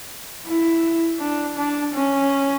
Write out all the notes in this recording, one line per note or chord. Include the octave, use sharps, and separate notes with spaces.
E4
D4
D4
C#4